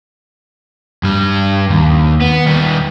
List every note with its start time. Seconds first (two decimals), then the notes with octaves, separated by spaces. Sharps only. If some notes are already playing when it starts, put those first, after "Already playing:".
1.03 G2 G3
1.70 D#2
2.21 B3
2.46 D#2 G3